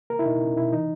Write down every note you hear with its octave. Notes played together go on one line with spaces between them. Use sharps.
A#3 A#4
E4
B2 D#4
C#4
B2 E4
E3 D#4